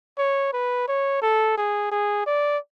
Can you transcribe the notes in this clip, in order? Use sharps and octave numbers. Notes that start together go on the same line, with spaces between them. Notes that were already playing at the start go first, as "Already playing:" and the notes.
C#5
B4
C#5
A4
G#4
G#4
D5